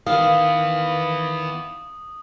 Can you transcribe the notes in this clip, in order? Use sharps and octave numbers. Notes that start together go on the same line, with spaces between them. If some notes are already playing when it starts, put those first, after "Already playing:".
D#3 E3 B3 F5 D#6